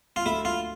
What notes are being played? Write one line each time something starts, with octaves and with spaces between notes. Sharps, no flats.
F4
D2 E4
F4